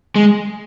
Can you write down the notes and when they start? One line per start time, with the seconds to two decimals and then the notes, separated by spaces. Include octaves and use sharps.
0.16 G#3